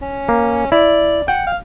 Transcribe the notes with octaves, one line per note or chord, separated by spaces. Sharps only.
C#4
A#3
E4 D5
F#5 G5
F5